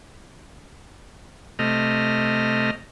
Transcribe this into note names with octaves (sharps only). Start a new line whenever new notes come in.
C3 A3 D#5 F6